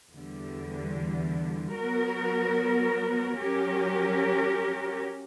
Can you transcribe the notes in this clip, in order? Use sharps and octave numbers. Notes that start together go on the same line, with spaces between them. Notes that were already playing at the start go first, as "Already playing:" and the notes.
E2 D3 G3
F#3 B3 F#4 A#4
F#3 C#4 G4 A#4